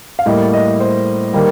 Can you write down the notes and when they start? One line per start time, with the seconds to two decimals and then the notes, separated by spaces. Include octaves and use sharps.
0.19 F5
0.26 A2 G3 A#3 D#5
0.53 D#5
0.80 C5
1.33 D#3 G3 A#3